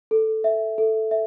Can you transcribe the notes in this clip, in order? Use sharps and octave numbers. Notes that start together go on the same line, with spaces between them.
A4
E5
A4
E5